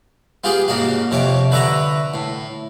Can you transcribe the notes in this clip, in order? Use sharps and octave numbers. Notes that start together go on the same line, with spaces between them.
B3 F4 G4 G#4
G#2 C#3 A#3 F#4
F2 C3 C#5 D6
D3 B4 E5 A#5 C#6
A2